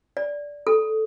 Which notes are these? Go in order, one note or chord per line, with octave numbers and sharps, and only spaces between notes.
D5
A4